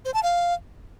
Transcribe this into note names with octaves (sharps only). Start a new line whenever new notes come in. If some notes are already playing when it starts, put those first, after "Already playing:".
C5
A5
F5